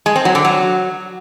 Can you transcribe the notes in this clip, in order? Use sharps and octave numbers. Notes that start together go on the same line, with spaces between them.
G#3
C4
F#3
D3
F#3